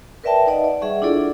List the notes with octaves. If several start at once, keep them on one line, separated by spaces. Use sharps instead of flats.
A#4 B4 D5 E5 G5 A5
D#4 B4 D5 D#5 F#5
D5
G3 G#4 E5 F#5 C#6
D4 E4 F4 G#4 A4 D5